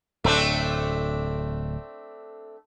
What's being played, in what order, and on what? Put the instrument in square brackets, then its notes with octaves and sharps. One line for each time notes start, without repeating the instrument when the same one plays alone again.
[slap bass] D1 [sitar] A3 C4 D4